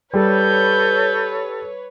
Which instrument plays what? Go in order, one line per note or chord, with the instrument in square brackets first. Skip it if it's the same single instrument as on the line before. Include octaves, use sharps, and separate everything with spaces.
[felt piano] G3 [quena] A4 [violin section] B4 C#5 [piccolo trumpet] G6